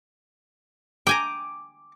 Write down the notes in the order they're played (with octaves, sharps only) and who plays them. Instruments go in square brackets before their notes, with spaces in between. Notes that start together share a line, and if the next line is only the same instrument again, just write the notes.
[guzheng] G5 G#5 A#5 [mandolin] D6